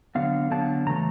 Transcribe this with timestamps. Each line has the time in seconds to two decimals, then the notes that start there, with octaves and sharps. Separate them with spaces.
0.15 D3 F#3 B3 F5
0.51 D3 F#3 B3 A5
0.87 C#3 E3 A3 A#5